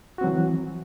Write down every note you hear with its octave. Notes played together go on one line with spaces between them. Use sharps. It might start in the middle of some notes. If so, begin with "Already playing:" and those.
E3 F#3 C4 F#4